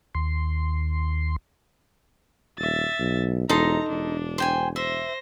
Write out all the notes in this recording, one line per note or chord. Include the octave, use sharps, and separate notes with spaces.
D#2 C6
D#1 E5 A6
B1
E1 D#4 A4 A#5 C6
E1 D4
C5 G5 G#5
C5 E5 A#6